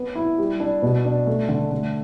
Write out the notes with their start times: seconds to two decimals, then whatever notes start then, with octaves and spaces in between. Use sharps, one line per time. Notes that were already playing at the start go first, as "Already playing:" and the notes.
Already playing: B3
0.15 E4
0.38 G3
0.60 D4
0.82 B2
1.05 D4
1.27 A3
1.49 D3
1.71 A3